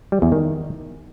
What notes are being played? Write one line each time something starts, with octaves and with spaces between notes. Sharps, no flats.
G3
E2
D#3